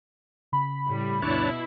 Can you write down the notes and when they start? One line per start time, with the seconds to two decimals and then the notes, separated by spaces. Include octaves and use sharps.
0.53 C#3 B5
0.87 A2 G3
1.23 D2 G2 B2 D4 E4 C#5 A5